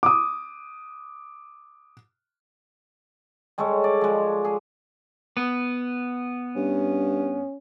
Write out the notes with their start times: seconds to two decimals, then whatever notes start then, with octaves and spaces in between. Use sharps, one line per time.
0.03 D6 D#6
3.58 G3 G#3 A4 C#5
3.84 D5
4.01 F3 G#3
4.45 G#4
5.37 B3
6.56 G2 C#4